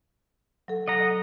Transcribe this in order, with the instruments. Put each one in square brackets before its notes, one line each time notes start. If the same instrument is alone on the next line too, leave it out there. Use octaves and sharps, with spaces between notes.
[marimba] F#3 A4
[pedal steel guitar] D#5 F#5 A#5